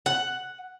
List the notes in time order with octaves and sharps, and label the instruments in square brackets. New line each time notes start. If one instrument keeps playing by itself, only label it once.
[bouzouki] F#5